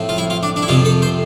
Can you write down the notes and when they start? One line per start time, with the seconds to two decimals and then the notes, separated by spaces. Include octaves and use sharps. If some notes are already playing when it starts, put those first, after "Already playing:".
Already playing: A2 F3 C4
0.09 F4
0.18 E4
0.30 F4
0.43 D4
0.56 D4
0.62 E4
0.68 F2 C3 F3 F4
0.85 A4
1.02 C5